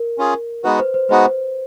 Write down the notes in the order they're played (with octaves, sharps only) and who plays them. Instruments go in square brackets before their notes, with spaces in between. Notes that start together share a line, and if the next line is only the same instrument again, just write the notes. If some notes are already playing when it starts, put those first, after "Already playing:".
Already playing: [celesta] A#4
[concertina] C#4 F4 G#4
[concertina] G#3 B3 D#4 F#4 [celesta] B4
[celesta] C5
C5
[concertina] G#3 B3 D#4 F#4 [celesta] C5